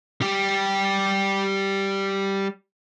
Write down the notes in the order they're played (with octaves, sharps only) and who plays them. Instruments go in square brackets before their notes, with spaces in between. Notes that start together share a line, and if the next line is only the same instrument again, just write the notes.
[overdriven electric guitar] G3 G4